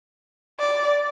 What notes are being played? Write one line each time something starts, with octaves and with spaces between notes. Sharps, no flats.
D5